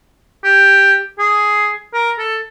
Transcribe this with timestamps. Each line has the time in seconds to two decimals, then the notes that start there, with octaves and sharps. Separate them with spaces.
0.44 G4
1.19 G#4
1.94 A#4
2.19 A4